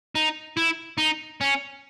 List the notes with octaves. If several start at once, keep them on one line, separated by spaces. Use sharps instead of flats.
D#4
E4
D#4
C#4